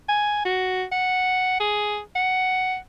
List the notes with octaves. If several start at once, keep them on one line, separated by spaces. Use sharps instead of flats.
G#5
F#4
F#5
G#4
F#5